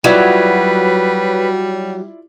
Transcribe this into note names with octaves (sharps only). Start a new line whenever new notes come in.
F#3 G3 E4 F4 B4 D5